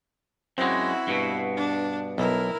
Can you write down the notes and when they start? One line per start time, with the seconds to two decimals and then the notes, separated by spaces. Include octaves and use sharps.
0.58 F#2 G#3 C4 E4 F#4
1.07 G2 B2
1.56 D4
2.18 B1 E4 A#4